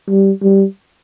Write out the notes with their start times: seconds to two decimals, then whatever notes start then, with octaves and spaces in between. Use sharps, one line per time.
0.09 G3
0.42 G3